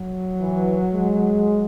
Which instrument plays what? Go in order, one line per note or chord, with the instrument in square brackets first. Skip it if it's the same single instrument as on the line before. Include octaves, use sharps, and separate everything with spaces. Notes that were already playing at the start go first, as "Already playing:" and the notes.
Already playing: [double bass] F#3
[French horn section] E3
G#3